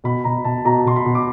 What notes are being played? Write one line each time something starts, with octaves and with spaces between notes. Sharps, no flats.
B2 B5
B2 A#5
B2 A5
B2 A#5
B2 C6
B5
B2
D6